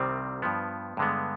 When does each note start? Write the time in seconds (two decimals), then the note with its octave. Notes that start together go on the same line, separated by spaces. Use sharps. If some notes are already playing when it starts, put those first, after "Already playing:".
Already playing: C2 C3 D#3 G3 C4
0.42 G2 F3 B3
0.97 G2 D3 G#3 B3